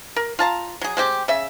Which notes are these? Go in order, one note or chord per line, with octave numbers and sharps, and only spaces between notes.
A#4
F4 A5 A#5
F#3 G#4
G#3 C4 G4
C#3 E5